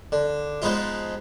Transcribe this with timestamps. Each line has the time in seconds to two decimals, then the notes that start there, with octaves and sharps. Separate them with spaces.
0.12 D3
0.62 F3 G#3 B3 D#4 F4